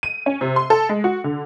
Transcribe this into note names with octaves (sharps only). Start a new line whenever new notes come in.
D#7
C#4
C3
C6
A4
G#3
F#4
D3